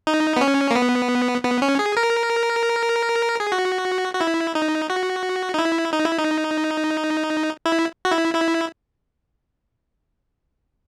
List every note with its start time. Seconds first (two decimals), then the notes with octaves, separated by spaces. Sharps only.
0.07 D#4
0.37 B3
0.41 C#4
0.71 A#3
0.75 B3
1.44 B3
1.62 C#4
1.79 G#4
1.97 A#4
3.40 G#4
3.52 F#4
4.14 F#4
4.21 E4
4.55 D#4
4.90 F#4
5.54 D#4
5.59 E4
5.93 D#4
6.05 E4
6.18 D#4
7.66 E4
8.05 F#4
8.11 E4
8.35 E4